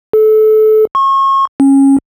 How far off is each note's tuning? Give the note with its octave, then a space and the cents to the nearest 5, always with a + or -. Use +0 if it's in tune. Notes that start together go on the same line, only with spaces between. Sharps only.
A4 -25
C#6 -35
C#4 -20